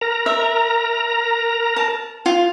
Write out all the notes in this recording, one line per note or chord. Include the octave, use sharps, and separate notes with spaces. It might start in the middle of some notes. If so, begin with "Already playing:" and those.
A#4 A#5
E5
A5
F4